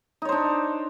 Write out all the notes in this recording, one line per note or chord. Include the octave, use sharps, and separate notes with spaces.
D4 D#4 C5 C#5